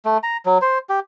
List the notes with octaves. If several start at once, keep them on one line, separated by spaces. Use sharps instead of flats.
A3
A#5
F#3
C5
G4